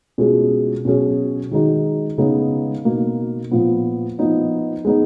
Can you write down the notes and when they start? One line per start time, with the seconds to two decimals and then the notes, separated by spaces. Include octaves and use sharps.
0.18 B2 G#3 C#4 F4 G#4
0.85 B2 F#3 C#4 G#4
1.51 D#3 G#3 D#4 F#4
2.18 C#3 G#3 B3 D#4 G#4
2.85 B2 A#3 D#4
3.51 A#2 F3 B3
4.19 F3 B3 D#4
4.85 G#3 B3 D#4